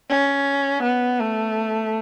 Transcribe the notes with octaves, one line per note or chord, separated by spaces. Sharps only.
C#4
B3
A3